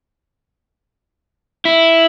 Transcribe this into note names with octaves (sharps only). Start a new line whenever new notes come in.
E4